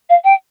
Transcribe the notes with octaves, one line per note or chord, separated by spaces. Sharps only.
F5
G5